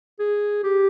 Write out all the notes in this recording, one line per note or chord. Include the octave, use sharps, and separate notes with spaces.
G#4
G4